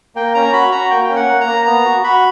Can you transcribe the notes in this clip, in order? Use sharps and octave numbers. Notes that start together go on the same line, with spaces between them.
A#3 G5
C#4 A#5
F#4 B5
F#4 A#5
A#3 G5
C#4 G5
F#5
A#3
A#5
A#3
B3 A#5
F#4
F#4 B5